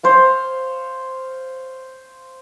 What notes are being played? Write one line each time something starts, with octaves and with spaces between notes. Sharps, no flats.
C5 C#5 F5